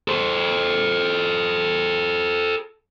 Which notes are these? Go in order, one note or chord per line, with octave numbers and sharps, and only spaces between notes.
A4 C5